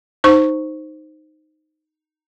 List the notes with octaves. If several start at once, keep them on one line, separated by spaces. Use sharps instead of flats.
D#4 C5 C#6